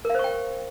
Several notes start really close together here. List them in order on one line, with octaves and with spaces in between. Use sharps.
A#4 F5 C5 C#6 G5